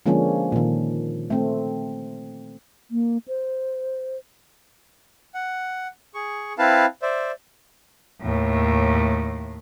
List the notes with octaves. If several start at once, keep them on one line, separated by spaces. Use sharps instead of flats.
D3 F3 G#3 A#3 C#4 D4
A#2 D#3
A3 C4
A#3
C5
F#5
G#4 C#6
C4 E4 B4 F5 A5
C5 D5 E5
D#2 A2